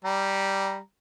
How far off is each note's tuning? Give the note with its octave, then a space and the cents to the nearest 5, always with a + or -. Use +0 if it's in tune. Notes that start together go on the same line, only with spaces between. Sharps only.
G3 -5 A#5 +0